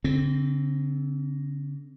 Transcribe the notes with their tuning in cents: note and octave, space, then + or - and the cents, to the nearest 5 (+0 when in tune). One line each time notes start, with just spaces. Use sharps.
D3 -45 C4 +0